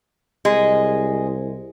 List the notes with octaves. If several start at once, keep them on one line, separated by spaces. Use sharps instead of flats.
C2 G#3